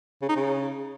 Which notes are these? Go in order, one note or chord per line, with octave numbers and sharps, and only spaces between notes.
C#3
D#4
C#3